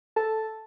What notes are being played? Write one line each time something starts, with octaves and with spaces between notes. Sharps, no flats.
A4 A5